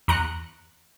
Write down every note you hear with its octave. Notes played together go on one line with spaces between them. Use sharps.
E2 A#5 F#6 C#7